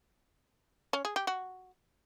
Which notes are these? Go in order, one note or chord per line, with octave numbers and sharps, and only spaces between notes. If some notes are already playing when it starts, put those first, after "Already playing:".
C#4
G#4
G4
F#4